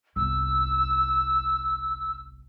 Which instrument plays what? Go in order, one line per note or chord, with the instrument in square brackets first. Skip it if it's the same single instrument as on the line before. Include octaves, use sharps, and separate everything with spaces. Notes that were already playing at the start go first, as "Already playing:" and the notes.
[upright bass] G1 C2 [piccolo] E6